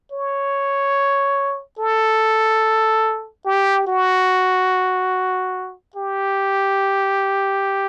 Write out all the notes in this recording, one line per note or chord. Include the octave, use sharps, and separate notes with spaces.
C#5
A4
G4
F#4
G4